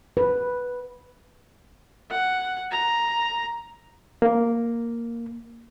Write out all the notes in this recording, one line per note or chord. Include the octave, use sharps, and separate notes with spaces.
B4
F#5
A#5
A#3